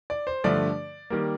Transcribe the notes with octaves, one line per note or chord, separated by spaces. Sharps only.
D5
C5
G2 D3 F3 A3 D5
D#3 G3 A#3